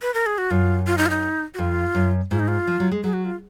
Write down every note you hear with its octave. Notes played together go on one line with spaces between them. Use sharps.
B4
A#4
G#4
F#4
F#2 F4
F4
D#4
F4
D#4
F#4
F2 F4
F#2
G#2 F4
D#4
F4
F3
F#3
G#3
F#3 G#4
F#4
F4